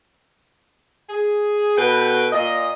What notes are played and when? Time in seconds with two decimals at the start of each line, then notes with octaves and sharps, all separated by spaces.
1.10 G#4
1.77 B2 A4 B4 G5
2.33 A#2 D#5